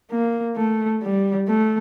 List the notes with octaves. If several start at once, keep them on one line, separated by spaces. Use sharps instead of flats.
A#3
A3
G3
A3